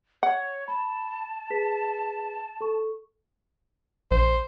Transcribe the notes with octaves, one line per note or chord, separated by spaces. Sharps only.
C#5 F#5
A5 B5
G#4 B4 B6
A4 C#6
A#1 C5